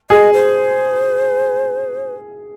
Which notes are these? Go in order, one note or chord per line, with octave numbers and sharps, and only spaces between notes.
G#4 D#5
C5